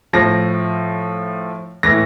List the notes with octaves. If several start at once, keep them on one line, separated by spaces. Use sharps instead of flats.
A2 F3 A#6
A2 E3 A#6